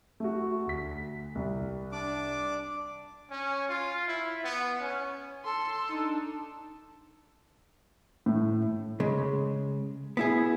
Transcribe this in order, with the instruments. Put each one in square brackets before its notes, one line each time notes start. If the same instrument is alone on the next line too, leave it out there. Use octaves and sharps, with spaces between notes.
[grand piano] A3 F#4
D2 B6
C2
[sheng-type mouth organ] D4 D6
[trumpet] C#4
F4
E4
B3
C#4
[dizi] A4 [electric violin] C6
[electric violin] D4 D#4
[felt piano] A2
[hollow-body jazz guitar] C#3 G#3
B3 E4 G#4